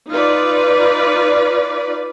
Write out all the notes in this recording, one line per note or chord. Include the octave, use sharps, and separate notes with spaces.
D#4 F4 B4 D5